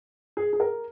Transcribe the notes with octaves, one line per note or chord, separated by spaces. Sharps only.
G#4
G#4
A#4